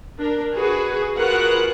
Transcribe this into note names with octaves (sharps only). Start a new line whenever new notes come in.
D4 A#4
F#4 G#4 B4
F4 F#4 G#4 A#4 B4 F#5